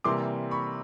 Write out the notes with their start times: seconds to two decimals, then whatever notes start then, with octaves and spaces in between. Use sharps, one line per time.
0.04 C3 E3 G3 A#3 C6 D6
0.51 B5 C#6